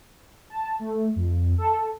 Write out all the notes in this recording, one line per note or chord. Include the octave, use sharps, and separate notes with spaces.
A5
A3
F2
A4